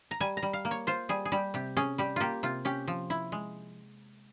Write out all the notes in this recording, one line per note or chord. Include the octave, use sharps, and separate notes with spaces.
A#5
G3 G#5
A#5
G3
F5
A#3
C#5
F4 C5
G3 G#4
G#4
G3 G4
C3 G4
C#4 G#4
G3 G4
A#3 F4 G4
C3 F4
C#4 G4
F3
E4
G#3